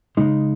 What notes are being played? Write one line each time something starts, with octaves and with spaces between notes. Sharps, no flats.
C#3 G#3 D#4